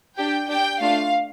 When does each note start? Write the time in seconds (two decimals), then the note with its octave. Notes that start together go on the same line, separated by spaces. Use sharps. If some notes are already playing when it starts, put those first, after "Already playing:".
0.17 D4 G4 G5
0.49 D4 G4 G5
0.80 A3 D4 F4 F5